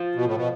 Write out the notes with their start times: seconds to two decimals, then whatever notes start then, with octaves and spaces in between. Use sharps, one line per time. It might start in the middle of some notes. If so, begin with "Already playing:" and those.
Already playing: F3
0.15 B2
0.26 A2
0.36 B2